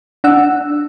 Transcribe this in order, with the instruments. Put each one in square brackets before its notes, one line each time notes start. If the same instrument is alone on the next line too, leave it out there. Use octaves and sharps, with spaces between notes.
[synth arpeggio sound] D4 F#5 E6